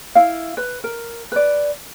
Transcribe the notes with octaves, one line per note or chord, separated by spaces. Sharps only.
E4 F5
B4
A#4
B4 D5